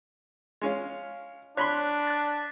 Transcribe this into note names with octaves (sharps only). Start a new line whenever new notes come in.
G#3 C#4 F4
D4 C#5 B5 C6 F#6 B6
F#6 A6